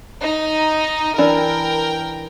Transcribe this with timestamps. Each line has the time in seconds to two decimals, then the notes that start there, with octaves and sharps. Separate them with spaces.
0.21 D#4
1.18 E3 D4 A#4 G5